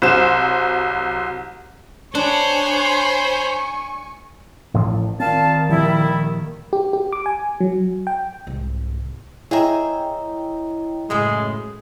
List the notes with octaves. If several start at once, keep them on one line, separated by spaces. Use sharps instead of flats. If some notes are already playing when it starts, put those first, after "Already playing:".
C2 F#3 C5 E7
D4 C5 C#5 G#5 B5 C#6
A1 A2 F3
A#2 D#3 C4 F5 A5
A#2 F3 G3 E4
G4
G4
D6
G#5
F#3
G5
C2 G#2
E4 G#4 C#5 D#5 E5 G5 A#5
F#2 A2 C#3 G#3